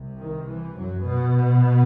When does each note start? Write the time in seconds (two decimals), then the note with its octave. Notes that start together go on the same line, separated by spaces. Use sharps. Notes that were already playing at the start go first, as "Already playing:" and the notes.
Already playing: C2 C3
0.19 D#3
0.47 E3
0.76 F#2 F#3
1.05 B2 B3